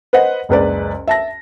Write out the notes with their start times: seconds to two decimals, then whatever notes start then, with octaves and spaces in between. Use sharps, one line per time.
0.13 B4 C5 D#5 F#5
0.49 F#1 C#2 B4 D5
1.07 E5 A5 A#6